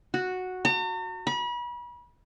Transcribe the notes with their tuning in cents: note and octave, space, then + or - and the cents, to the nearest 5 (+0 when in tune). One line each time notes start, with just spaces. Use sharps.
F#4 -5
A#5 -45
B5 -35